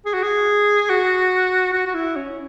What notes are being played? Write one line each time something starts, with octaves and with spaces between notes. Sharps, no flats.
G#4
F#4
G#4
F#4
F#4
F#4
E4
C#4